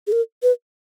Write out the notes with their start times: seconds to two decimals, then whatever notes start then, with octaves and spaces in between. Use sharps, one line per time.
0.07 G#4
0.12 A#4
0.43 B4